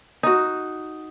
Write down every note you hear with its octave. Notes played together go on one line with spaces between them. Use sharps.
D#4 F#4